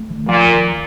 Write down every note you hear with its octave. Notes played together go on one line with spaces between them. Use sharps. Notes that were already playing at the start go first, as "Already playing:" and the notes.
Already playing: A3
D#3
A#2 F3
D2